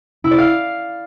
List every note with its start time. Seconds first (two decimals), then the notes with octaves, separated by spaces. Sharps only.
0.24 E4
0.31 D5
0.38 F5